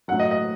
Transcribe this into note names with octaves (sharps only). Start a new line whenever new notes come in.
A2 F#3 F#5
D#5
D#5